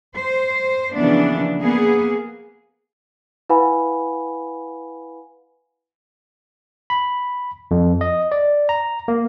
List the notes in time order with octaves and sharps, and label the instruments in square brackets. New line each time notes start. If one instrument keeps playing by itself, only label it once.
[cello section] C5
C#3 E3 F3 A#3 B3 D4
A#3 B3 G#4
[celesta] E4 B4 F5 F#5 G#5 B5
[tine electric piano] B5
F2
D#5
D5
A#5
A#3